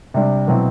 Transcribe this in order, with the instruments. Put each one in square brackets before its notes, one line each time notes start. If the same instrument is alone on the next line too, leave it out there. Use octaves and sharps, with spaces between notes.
[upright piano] C3 G3 D4
B2 F#3 C4 E4